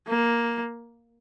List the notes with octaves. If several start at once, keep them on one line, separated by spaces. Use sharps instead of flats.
A#3